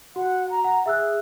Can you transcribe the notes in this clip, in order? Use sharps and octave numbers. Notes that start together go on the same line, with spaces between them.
F#4 F#5
A#5
F#5
G#4 E5 E6 F#6